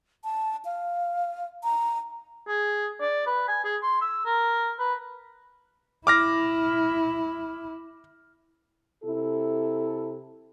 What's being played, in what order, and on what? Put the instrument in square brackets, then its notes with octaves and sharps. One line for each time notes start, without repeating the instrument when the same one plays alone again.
[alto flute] A5
F5
A#5
[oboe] G#4
D5
B4
G#5
G#4
C6
E6
A#4
B4
[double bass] E4 [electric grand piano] D6 F6 A#6
[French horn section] C3 E4 A4